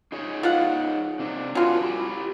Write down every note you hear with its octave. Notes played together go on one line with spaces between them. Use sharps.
D#4 G#4 C#5
F4 F5 F#5
C3 D4
F#3 F4 B4 G#5 A5
E4 G4